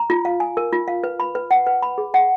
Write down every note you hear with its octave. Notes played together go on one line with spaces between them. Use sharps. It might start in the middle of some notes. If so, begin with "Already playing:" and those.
Already playing: A#5
F4
F5
G#5
A#4
F4
F5
B4
B5
B4
F#5
B4
B5
G#4
F#5